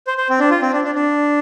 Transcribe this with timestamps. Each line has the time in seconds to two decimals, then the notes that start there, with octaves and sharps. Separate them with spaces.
0.07 C5
0.18 C5
0.30 C4
0.40 D4
0.51 F4
0.62 C4
0.73 D4
0.84 D4
0.95 D4